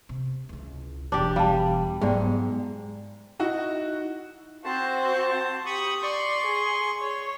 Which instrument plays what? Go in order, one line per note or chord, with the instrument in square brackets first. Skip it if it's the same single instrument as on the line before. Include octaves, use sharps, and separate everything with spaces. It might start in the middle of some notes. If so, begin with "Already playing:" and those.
[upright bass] C3
C#2 E4
[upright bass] E1 E2 [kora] D4 G4
[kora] G3 [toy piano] F5 A5
[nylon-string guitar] G#2 [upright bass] F#3 B3 [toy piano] G#4 D5 G5
[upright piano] D#4 E4 F#4
[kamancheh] C4 F#4 [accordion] C5 A5
[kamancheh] G4 [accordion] B5 C#6 D#6
[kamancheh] D5 [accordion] C6 C#6
[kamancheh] G#4
C#5